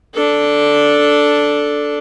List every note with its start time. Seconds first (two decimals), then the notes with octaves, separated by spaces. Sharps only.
0.14 D4 A4